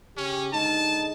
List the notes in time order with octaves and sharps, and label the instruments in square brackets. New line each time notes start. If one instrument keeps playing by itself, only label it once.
[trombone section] C#3 G4 [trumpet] C#4
[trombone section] D3 G#3 D#4 [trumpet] A5